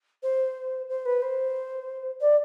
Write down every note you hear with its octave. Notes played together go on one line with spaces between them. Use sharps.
C5
C5
B4
C5
D5